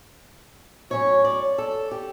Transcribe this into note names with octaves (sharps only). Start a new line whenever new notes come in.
A2 F#3 C#4 C#5
D5
A4
G4